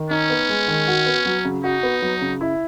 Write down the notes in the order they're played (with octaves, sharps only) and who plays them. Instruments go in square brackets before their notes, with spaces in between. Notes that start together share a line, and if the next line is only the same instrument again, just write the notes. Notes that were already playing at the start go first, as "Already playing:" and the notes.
Already playing: [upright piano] D#3
[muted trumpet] C#4 [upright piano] D#4
[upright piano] B3
G#3
D#3
F#4
B3
F#3
C#3
[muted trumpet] D#4 [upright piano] F#4
[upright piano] B3
F#3
C#3
E4